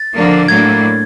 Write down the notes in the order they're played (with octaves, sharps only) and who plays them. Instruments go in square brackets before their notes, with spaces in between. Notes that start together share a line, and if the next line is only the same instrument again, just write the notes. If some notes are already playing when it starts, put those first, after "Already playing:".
Already playing: [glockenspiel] A6
[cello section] D3 F3 A#3 D4
[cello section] A2 F#3 A#3 D4 [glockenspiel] G#6